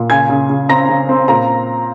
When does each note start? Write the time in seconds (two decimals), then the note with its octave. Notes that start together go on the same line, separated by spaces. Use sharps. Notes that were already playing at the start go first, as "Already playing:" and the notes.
Already playing: A#2
0.10 C#3 G#5 G#6
0.29 C#3
0.50 C#3
0.69 C4 A#5 A#6
0.89 C#3
1.09 C4
1.28 A#2 A#5